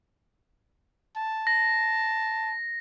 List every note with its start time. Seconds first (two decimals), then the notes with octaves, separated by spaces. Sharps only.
1.17 A5
1.47 A#6